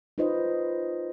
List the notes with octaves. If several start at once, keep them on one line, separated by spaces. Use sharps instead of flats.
D#4 F4 B4 C5 D#5